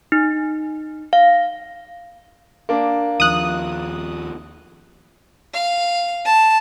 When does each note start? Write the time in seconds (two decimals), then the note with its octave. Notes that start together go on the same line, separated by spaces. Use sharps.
0.12 D#4
1.13 F5
2.69 A#3 D4
3.20 D#2 F3 D#6 F#6
5.54 F5
6.25 A5